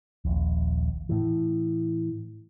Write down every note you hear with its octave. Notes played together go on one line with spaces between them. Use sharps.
D#1 A#1
A2 E3